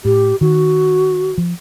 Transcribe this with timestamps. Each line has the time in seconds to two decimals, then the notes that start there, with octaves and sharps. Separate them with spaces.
0.05 A2 G4
0.41 D#3 F#4
1.38 F3